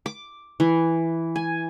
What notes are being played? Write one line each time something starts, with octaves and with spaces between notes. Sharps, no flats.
D6
E3
G#5